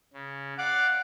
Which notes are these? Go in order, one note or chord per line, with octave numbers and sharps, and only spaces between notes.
C#3
D5 F5 F#5 D6